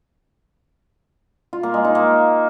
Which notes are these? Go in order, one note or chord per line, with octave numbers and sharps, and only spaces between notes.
F4
A#3
G#3
D#4
A#3